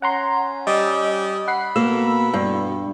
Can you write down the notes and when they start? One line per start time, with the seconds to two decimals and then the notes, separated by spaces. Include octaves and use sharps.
0.02 C#4 F#5 A#5 C6
0.67 G3 D#5 D#6 E6
1.48 F#5 B5 C7
1.76 B2 A#3 E6
2.34 G2